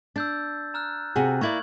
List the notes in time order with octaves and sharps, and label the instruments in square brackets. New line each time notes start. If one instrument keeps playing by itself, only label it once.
[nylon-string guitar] D4 [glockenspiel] E6 G6 A6
[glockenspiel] A#5 F6 F#6
[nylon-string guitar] C3 F#4 G#4
[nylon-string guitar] A#3 E4 D5 [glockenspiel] C#6 G#6 F#7